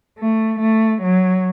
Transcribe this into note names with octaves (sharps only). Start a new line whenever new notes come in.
A3
A3
F#3